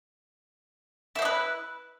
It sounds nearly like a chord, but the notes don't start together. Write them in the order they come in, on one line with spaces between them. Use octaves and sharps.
E4 C5 D#5 B4